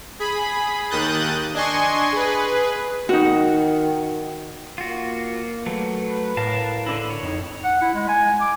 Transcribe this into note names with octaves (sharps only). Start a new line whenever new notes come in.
G#4 B5
D#2 D#3 D#6 F#6 G6 A6
D4 D#5 G#5 C6 C#6
G#4 B4
D#3 D#4 F#4
A#3 F4 F#4
F#3 A3 B4
A2 A#4 F5 A5
D3 D4 E4
C#5
F2 D#4
F#5
E4
G#3
G#5
D6